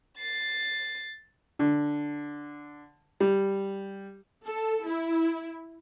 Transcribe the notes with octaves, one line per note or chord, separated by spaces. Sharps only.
A6 C7
D3
G3
A4
E4